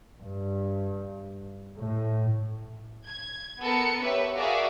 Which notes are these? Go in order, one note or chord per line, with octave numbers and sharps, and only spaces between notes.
G2
A2
G#6
B3 A4 A#4 C#7
G4 B4 C#5 E5
F#4 G#4 A#4 D5 E5 F5